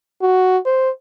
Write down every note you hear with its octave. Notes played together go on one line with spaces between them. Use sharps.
F#4
C5